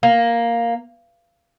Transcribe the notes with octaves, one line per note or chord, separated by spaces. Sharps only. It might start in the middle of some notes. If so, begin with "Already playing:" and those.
A#3